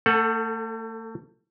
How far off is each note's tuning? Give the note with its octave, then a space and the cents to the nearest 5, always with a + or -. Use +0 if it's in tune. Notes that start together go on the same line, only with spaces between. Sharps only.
A3 +35 A4 +0 F#5 +0